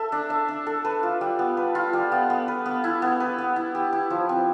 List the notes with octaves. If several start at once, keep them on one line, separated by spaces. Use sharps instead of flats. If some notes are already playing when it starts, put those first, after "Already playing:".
Already playing: A4 E5
D4
E5
D4
A4
B4
F4
G3
B3
B4
F4
G3
B3
B3
B4
B3
E4
B3
B4
B3
E4
G4
E4
F3
C4